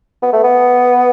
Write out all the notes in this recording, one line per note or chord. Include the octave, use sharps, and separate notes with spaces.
B3
A3
B3